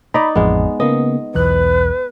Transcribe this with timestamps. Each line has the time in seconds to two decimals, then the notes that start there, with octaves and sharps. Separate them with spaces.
0.14 D#4 D5 A#5 B5
0.35 A1 F2 G#3 B3
0.80 C#3 A#3 B3 D#5
1.34 B1 E2 B4 F#6